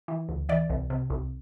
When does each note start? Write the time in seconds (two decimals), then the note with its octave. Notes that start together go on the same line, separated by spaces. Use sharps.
0.08 E3
0.29 D2
0.49 E3 D5
0.69 C2
0.90 C3
1.10 C2